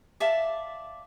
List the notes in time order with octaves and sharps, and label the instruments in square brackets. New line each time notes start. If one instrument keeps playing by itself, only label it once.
[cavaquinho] D5 E5 F5 A5